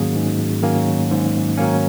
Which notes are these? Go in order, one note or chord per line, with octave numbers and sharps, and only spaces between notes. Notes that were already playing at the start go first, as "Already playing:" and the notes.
Already playing: G#2 D#3 F#3 A#3 C#4 F#4 G#4
G#2
D#3 F#3 A#3 C#4
G#2
D#3 F#3 A#3 C#4